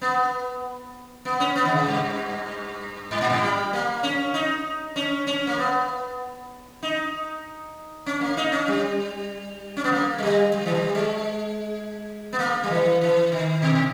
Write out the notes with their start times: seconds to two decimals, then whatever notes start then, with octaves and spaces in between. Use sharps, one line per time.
0.02 B3
1.25 B3
1.40 C#4
1.56 B3
1.65 D#3
1.71 C#3
1.86 G2
3.11 G#2
3.21 A#2
3.30 G#2
3.41 G3
3.73 A#3
4.03 C#4
4.34 D#4
4.96 C#4
5.27 C#4
5.47 A#3
5.58 B3
6.83 D#4
8.06 C#4
8.21 A#3
8.37 D#4
8.52 C#4
8.68 G3
9.77 C#4
9.84 B3
9.92 A#3
10.18 G#3
10.23 G3
10.53 G3
10.66 E3
10.74 G3
10.95 G#3
12.33 B3
12.39 A#3
12.64 G3
12.70 E3
13.01 E3
13.32 D#3
13.62 B2